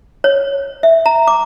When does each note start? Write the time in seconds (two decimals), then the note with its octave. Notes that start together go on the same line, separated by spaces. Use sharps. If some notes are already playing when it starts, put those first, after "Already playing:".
0.24 C#5
0.83 E5
1.06 A#5
1.28 D6